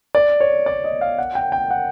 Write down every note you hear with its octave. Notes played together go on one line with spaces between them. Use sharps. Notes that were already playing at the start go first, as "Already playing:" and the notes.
D5
C#5
D5
D#5
F5
F#5
G5
G5
F#5